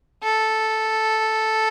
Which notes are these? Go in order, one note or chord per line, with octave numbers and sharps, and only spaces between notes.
A4